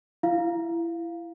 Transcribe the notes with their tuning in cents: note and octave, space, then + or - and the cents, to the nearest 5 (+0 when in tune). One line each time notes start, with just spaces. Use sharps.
E4 +25 F5 +0